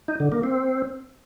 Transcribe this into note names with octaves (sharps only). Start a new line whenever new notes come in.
D#4
D3
A#3
C4